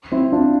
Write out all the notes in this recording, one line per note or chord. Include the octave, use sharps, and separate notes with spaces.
C4 E4
D4 F4